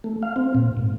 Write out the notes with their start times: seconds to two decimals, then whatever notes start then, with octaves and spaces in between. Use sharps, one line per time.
0.04 A3
0.23 F5
0.36 C4
0.55 A#2
0.77 G#2